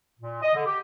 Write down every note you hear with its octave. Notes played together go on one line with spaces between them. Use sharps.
A#2
D#5
D3
G4